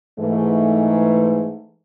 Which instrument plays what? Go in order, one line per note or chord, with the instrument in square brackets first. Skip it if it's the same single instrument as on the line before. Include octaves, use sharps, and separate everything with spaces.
[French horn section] G#2 E3 A3